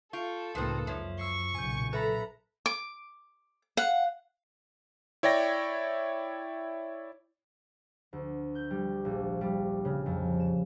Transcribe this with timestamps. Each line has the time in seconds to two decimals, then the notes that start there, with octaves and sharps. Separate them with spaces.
0.13 F4 A4 C#6 G6 D7
0.55 C#2 A2 F3 A#3 C4 D#4 B4 D#6
0.87 F#2 F3 C#5 E5
1.20 C#6 E6 C7
1.55 B1 A#2 C#3 G#5 G6
1.93 A4 B4 E5 A#5 B5
2.66 D6
3.77 F5 F#5
5.23 E4 C#5 D5 G5 A#6
8.13 D2
8.55 G6
8.71 G3
9.05 A#1
9.41 G3
9.85 C#3
10.06 F2
10.40 E7